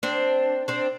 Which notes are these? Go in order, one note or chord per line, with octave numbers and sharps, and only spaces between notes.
C4 D4
C4 D4